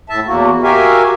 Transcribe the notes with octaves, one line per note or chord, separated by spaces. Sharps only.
A2 E5 A5
E2 A#3 F#4
F#4 G4 A#4 E5 F5 G#5